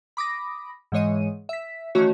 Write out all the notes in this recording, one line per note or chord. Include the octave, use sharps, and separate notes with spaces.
B5 D6 D#6 A#6
G#2 E3 G#3 C#5 D#5 D#7
E5 B6
D#3 E3 A3 C#4 F#4 C#5